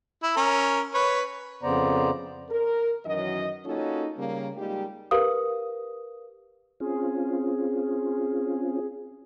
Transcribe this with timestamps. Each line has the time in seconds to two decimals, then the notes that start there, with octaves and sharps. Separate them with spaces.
0.23 E4
0.37 C#4 A#4
0.94 B4 C#5
1.63 F2 C#3 B3 C5 D5 A#5
2.50 A#4
3.06 F#2 D#3 E3 F#3 D#5
3.65 A#3 C#4 D#4 F4 F#4 A4
4.17 C#3 G3 A#3
4.56 G3 G#3 A#3 D#4 F4 G4
5.11 G4 A#4 B4 F5 D#6
6.80 C4 C#4 F4 G#4